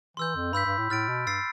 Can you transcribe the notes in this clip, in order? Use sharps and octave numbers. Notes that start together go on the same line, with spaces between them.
E3 C6 E6 G6
F2
G2 B5 E6 G6 B6
G2
A2
A2 F6 A6 D7
B2
G2 E6 A6 C7